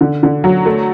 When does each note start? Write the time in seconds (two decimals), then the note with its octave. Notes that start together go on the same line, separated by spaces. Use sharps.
0.01 D3
0.23 D3
0.44 F#3
0.66 A3